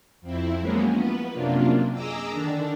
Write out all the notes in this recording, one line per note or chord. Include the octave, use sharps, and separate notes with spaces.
F2 C4 E4
F3 F#3 G#3 A#3 B3 C#4
B3 B4
F#2 C3 A#3 D4 F4
G#4 D#5 A#5 D6 E6
D3 D#3 D4